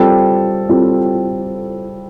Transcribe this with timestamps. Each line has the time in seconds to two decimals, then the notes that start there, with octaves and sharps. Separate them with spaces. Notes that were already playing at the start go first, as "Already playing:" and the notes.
Already playing: G3 C4 F4 A4
0.69 G3 C4 F4 A4